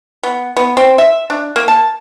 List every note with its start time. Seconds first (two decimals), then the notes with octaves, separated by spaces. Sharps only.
0.23 B3
0.56 B3
0.77 C4
0.98 E5
1.30 D4
1.56 A#3
1.68 A5